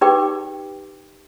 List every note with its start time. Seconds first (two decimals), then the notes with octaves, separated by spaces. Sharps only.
0.01 D#4 G4 B4 G5 D6